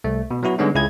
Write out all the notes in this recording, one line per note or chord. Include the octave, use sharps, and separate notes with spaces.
C2 A3
B2
F#3 B3 E4 F#4
D3 G3 G#3 B3 C#4 D#4
C#2 E4 G#4 G#6